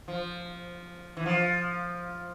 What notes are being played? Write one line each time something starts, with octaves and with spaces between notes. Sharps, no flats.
F3
E3
F3